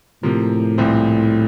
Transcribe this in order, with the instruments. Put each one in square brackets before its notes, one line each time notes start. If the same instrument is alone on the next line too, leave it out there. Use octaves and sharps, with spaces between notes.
[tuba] A2 [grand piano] C3 F3 A#3
[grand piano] C2 A#2 F3 C4